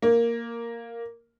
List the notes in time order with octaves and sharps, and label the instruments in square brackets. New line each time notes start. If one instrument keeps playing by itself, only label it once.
[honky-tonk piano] A#3